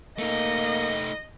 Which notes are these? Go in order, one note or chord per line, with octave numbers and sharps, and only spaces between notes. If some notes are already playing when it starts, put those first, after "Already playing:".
A3 A#3 D#4 D#5